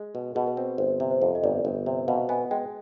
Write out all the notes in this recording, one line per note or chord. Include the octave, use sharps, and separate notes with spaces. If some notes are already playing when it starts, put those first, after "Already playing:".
Already playing: G#3
B2
B2 G#4
B4
C4
G1 C5
C3
C5
F2
D#5
G1 D5
G1
C3
B2 F5
B3 G#5
G#3 G5